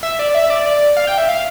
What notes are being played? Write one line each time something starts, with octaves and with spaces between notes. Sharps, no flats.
E5
D5
E5
D5
D5
F5
G5
E5
F5